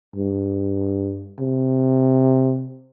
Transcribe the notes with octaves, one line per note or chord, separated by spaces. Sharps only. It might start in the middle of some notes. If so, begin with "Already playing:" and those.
G2
C3